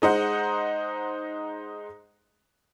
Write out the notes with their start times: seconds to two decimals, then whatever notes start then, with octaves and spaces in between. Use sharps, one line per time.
0.02 G#3 D#4 C5 F#5